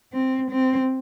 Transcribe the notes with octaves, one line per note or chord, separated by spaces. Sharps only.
C4
C4